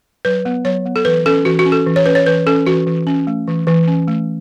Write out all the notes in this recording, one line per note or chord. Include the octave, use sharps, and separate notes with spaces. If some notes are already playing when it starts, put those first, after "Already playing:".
F#3 B4
B3
F#3 C#5
B3
A4
E3 B4
C#4 A4
E3 F#4
F#4
C#4
A4
E3
C#5
C#4 B4
C#5
E3 B4
C#4 A4
E3 F#4
E3
C#4
A3
E3
E3
C#4
A3